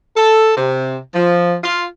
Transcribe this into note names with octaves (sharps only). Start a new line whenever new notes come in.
A4
C3
F3
F4